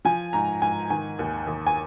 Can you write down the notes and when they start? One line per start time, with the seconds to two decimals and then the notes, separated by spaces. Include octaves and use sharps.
0.05 F3 G#5
0.33 G#2 A#5
0.62 G#2 G#5
0.90 D#3 G#5
1.19 D#2
1.47 D#2
1.67 G#5